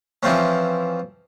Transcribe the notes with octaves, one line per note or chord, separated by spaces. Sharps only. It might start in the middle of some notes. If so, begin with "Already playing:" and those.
E3 F3 C4 C#4